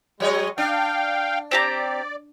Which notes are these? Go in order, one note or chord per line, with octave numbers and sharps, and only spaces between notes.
F#3 G#3 C#5 D#5
D4 F5 G5
C4 G4 D5 A#5